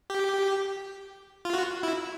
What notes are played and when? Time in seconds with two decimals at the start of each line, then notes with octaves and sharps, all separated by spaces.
0.10 G4
1.45 F4
1.53 F#4
1.83 E4